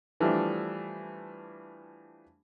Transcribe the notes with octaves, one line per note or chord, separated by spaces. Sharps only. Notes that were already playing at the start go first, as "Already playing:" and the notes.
E3 F3 G3 A3 D4